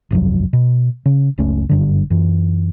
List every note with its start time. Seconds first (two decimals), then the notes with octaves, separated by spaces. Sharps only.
0.11 G1 C2 F2 F#3
0.53 B2
1.06 C#3
1.38 F#1 C#2 A3 C#4
1.69 F#1 G2 D3
2.10 F#2 E3